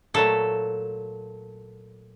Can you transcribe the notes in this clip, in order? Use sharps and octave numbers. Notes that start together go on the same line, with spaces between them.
A#2 F#3 A3 A4